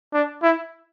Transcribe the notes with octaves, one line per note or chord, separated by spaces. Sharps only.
D4
E4